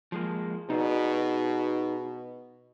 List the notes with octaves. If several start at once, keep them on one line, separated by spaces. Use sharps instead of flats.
F3 G#3 A#3
B2 D#4 G#4 D5